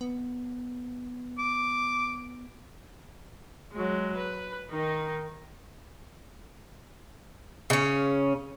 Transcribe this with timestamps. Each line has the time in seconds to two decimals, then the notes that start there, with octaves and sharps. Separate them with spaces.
0.01 B3
1.38 D6
3.73 F#3 G#3
4.17 B4
4.70 D#3 D#4
7.70 C#3 C#4